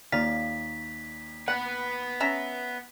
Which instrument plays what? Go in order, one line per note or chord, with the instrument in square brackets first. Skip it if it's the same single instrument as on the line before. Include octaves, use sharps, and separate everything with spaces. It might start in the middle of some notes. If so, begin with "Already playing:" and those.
[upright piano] D#2 D5 A#5 [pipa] F4 F5 [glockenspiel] B6
[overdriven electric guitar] B3 B4 [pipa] F#5
[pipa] C#4 E5 A#5